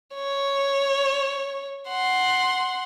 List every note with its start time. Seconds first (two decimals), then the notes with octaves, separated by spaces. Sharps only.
0.15 C#5
1.88 F#5 C6